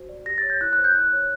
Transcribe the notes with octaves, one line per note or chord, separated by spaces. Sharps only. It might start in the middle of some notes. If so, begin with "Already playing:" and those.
Already playing: F#4 C5
D5
G4 A#6
C#5 A6
G6
E4 F#6
F#6
C5
G6
E4 F#6
C#5